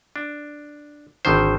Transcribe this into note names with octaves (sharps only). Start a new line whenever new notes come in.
D4
G#1 D3 D#3 C5